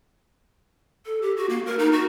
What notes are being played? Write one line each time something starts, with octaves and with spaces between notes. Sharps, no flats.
A4
G4
F#4
A#3
A#4
D#4
F#4